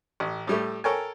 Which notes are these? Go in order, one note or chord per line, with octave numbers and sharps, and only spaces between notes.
A1
A2 G3 A3
A4 A#4 C#5 G5 G#5